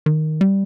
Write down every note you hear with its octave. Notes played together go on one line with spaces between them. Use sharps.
D#3
G3